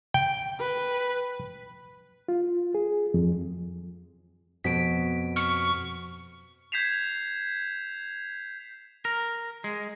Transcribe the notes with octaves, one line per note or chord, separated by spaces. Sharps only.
G5
B4
F4
G#4
F2
F2 B2 F#4 B6 D7
C#6 F6
G6 G#6 B6 C7 E7 F7
A#4
G#3